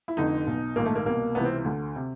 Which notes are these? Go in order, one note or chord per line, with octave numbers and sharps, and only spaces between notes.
E4
F1 F2 D3 D#4
B1 B2
A#1 G#2 D#3 A#3
A3
A#3
C2 B2 A#3
C#2 C3 E3 B3
C4
D2 D3
C3